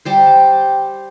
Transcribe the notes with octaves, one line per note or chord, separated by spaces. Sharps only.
G3 G4 C5